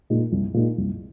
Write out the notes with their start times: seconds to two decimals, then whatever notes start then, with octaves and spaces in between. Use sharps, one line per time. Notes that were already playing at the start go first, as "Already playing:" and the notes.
0.10 A#2 G#3 D#4
0.32 C2
0.54 A#2 G#3 D#4
0.78 C2